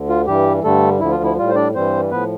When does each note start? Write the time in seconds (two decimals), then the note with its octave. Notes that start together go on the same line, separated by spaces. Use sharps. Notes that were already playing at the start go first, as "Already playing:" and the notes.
Already playing: D2 D3
0.09 F4
0.26 G2 E3 G3 G4
0.64 G2 D3 G3 A3 A4
1.00 D2 D3 F3 E4
1.11 F4
1.23 E4
1.37 A2 G3 F4
1.49 C5
1.55 D4 D5
1.75 G2 E3 G3 C4 C5
2.11 A2 F3 B3 B4